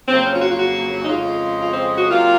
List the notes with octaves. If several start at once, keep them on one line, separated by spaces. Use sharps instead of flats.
F2 C#3 F#3 A#3 C4
C#4
F4
F#4
F4
F#4
D#4
F2 C#3 G#3 F4
F4
C4
F#4
C3 F#3 A#3 F4